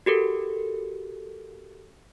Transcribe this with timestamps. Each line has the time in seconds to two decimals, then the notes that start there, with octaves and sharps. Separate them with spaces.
0.06 F#4 G4 A4 A#4